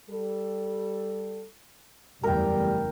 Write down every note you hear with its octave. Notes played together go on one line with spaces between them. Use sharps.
G3 A4
F#1 E2 G3 A3 A#4 G5